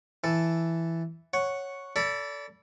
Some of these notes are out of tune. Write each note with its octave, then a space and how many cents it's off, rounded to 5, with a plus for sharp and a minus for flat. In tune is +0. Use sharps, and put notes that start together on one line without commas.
E3 +5 A4 +0
C#5 +0 F#5 +0
A4 +15 D5 -30 B5 -15